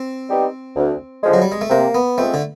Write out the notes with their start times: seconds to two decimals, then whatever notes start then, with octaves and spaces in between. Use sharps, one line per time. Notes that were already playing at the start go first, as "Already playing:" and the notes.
Already playing: C4
0.29 G3 B3 D#4 G4
0.76 D2
1.24 D3 F3 G#3
1.34 F#3
1.42 G3
1.52 G#3
1.61 A3
1.70 C3 A#3
1.95 B3
2.18 F3 G#3 A3 C4
2.34 D3